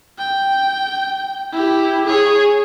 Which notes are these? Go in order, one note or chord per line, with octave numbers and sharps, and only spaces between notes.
G5
E4 G4
G#4 C#5